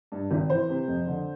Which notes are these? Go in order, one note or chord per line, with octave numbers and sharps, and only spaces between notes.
G2
G#1
E3 C5
C3
F2
D3